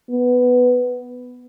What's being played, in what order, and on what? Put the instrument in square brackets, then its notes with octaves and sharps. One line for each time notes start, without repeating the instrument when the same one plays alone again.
[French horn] B3